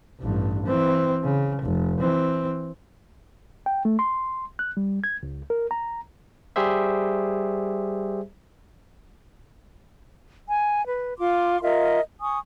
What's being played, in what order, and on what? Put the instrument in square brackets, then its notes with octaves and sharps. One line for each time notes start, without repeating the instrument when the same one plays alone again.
[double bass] A1 G2
E3 C4
C#3
F1
E3 C4
[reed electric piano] G5
A3
C6
F#6
G3
G#6
C#2
A#4
A#5
[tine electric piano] G3 G4 G#4 C5 E5
[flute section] G#5
B4
F4 C6 D6
F4 A#4 D#5 E5
G#5 C#6 D#6